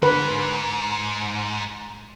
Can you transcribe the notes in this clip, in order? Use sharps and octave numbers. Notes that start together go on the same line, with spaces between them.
F2 G#2 D3 B4